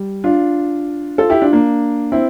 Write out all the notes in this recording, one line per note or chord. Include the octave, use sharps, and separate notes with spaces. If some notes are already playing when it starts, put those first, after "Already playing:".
Already playing: G3
D4 F4
F4 A4
E4 G4
D4 F4
A#3 D4
C4 E4